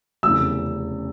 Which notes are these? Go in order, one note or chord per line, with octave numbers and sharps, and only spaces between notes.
F1 E2 C#3 E6